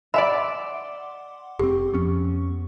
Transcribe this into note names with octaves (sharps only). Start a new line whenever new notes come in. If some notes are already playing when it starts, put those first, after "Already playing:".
D5 E5 F#5 G#5 B5 C6 D6
F1 C4 G4
F2 B3 C#4 C#6